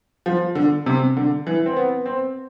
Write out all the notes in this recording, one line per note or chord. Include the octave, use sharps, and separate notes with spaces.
F3
D3
C3
D3
E3
C4
B3
C4